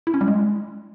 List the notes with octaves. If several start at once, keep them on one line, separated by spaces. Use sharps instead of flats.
E4
C#4
G3
G#3